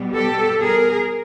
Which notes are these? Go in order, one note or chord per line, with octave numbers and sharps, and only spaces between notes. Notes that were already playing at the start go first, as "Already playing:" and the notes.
Already playing: B2 G3 B3
G4 A4
G#4 A#4